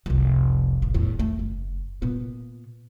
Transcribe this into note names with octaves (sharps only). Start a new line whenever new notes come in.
F1 C2
A1
E2 A2
A3
F#1
A#2 B3